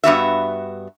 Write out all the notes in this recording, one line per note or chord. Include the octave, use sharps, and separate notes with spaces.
G2 B3 F#4 E5